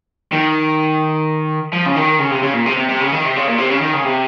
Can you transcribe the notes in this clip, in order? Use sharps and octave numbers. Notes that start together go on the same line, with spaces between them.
D#3
F3
C#3
D#3
C#3
C3
C#3
A#2
C3
C3
C3
C#3
D#3
C3
C#3
A#2
C3
C#3
D#3
C#3
C3